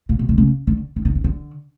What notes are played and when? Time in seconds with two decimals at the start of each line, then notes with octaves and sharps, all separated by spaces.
0.09 A#2
0.19 B2
0.29 C3
0.38 C#3
0.67 D3
0.96 D#3
1.05 D3
1.15 D#3
1.24 D3